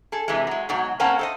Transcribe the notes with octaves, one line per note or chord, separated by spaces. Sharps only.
G#4 A4
C3 E3 G#3
F#3 G#3
G#2 B2 F#3
A#3 C4 C#4 F#5 A5
A4 C5 D#5